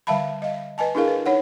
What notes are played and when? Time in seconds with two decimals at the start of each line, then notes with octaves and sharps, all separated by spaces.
0.07 D3 G3 E5 F5 A5 B5
0.42 D#5 F5
0.78 B4 D#5 G#5 A5
0.95 D4 E4 G#4 A#4 F5
1.08 B4
1.26 D#4 C#5 F#5